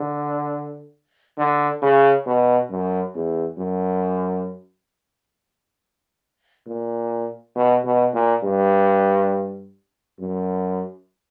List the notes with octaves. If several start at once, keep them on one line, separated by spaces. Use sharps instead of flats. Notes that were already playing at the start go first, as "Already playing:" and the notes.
Already playing: D3
D3
C#3
B2
F#2
E2
F#2
A#2
B2
B2
A#2
G2
F#2